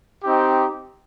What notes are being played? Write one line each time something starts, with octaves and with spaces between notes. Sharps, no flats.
C4 D#4 G4